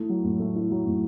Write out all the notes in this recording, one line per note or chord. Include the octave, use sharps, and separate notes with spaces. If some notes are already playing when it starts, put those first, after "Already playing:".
Already playing: A3 E4
F#3
A2
A3
E4
F#3
A2